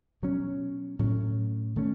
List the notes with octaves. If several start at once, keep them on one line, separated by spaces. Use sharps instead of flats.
B2 F#3 C#4
A2 F#3 C#4
D#3 A3 C#4